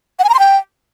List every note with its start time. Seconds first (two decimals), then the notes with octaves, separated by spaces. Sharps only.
0.19 F#5
0.24 G#5
0.29 A#5
0.34 C6
0.39 G5